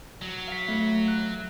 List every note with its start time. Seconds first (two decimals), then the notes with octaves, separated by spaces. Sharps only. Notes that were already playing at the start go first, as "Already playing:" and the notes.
0.22 F#3
0.48 F5 B6
0.68 A3
1.08 F#6